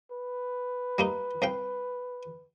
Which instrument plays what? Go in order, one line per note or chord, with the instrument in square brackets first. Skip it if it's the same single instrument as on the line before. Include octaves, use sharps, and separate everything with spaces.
[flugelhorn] B4
[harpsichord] G3 A#3 D#4
C2 F5 G5